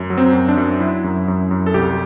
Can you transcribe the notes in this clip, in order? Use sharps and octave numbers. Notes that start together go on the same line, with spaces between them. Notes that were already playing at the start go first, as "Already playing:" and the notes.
Already playing: F#2
F#3
C4
F#2
D4
F#2
F#3 E4
F#2
F#2
F#2
A4
C2 G4